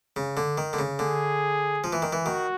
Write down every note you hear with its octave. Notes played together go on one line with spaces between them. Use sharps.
C#3
D3
D#3
D3
C#3
D3 G#4
F3
E3
D#3
E3
D#3 F#4